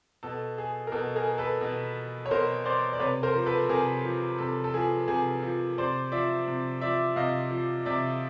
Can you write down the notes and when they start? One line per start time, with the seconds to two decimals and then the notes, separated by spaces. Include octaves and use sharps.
0.23 B2 A4
0.58 G#4
0.87 A#4
0.92 B2 A4
1.16 G#4 A#4
1.38 A4 B4
1.61 B2
2.26 C#5
2.31 B2 A#4 C5
2.65 C5 D5
2.93 D5
3.00 C3 B4 C#5
3.23 A#4 C5
3.35 F3
3.46 A4 B4
3.69 C3 G#4 A#4
4.04 F3
4.38 C3 A4
4.64 A4
4.74 F3 G#4
5.08 C3 G#4
5.43 F3
5.78 C3 C5 D5
6.12 F3 D5 E5
6.47 C3
6.81 F3 D5 E5
7.16 C3 D#5 F5
7.51 F3
7.86 C3 D5 E5